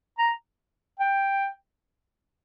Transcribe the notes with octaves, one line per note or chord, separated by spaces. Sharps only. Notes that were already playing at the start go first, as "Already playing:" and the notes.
A#5
G5